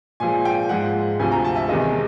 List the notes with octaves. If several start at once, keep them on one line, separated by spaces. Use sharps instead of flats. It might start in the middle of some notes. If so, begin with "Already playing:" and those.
A#2 F3 G#3 G#5
G5
G#2 F3 G#3 F#5
D2 C3 F3 G#5
A#5
A5
E5
E2 C3 D#3 G#3 D#5